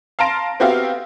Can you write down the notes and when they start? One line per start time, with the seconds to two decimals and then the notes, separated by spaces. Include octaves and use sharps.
0.19 F5 A5 A#5 C6 A#6 D7
0.60 B3 C4 F#4 G4 E5 F5